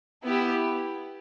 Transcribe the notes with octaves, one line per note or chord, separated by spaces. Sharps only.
B3 E4 G4